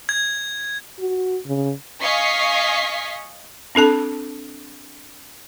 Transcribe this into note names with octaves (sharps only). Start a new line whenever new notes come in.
G#6
F#4
C#3
D#5 F5 G#5 C#6 B6 C7
C4 D4 A4 A5